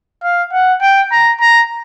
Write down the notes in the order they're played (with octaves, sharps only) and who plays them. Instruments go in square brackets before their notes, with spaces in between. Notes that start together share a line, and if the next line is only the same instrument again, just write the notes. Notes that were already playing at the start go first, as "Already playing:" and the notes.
[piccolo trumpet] F5
F#5
G5
A#5
A#5